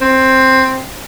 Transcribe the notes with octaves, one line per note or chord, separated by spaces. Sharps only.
C4